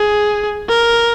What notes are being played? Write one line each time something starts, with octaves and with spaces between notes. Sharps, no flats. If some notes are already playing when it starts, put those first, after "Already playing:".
Already playing: G#4
A#4